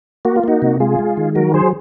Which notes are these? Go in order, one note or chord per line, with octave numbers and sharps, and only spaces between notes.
A#3 F#4
F4
A#3 D#4 F#4
C3
G#3 F4 G#4
G#3
D#3
F#3 F#4 A#4
F#3 G#4 C5